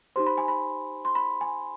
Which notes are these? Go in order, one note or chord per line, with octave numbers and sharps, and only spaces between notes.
D#4 G4 C5 C6
B5
G#5
B5
C6
B5
G#5